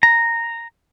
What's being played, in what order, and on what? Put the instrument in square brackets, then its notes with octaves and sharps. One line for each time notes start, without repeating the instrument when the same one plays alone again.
[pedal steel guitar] A#5